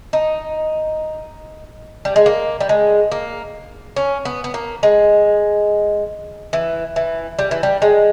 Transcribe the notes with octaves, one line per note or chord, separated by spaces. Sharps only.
D#4
G3
G#3
A#3
G3
G#3
A#3
C#4
B3
B3
A#3
G#3
E3
E3
G3
E3
G3
G#3